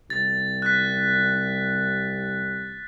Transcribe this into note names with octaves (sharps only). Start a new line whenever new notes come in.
C2 A6
F#6 B6